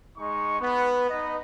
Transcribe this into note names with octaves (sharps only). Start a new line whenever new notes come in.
G#3 D#4 C#6
B3
D#4 B4 D#5